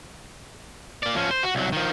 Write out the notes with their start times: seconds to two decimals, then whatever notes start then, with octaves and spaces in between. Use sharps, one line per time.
1.03 A#3 D5
1.16 F3 C#4
1.31 C5
1.43 F#4
1.55 C2 F#3
1.73 D#3 F3